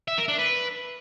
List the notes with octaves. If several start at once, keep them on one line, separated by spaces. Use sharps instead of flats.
E5
A#4
D4
B4